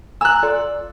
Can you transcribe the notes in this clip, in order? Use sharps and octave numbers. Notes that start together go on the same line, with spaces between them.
G#5 A#5 E6 F#6
F4 A4 D5